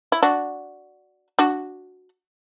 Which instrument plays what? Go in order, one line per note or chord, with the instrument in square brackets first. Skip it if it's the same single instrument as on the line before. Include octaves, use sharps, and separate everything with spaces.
[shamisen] E4
D4 F#4
D4 F#4